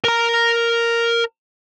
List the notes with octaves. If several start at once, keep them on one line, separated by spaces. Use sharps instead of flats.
A#4 A#5